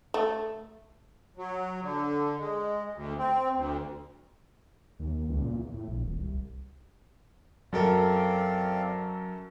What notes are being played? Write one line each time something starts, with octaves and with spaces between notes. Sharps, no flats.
A3
F#3
D3
G#3
D2
C4
D2
D#2
C#2
A#2
E2
A2
A#1
D#1
C2
F#2 F#3 C4 A4 A#4 D5 F5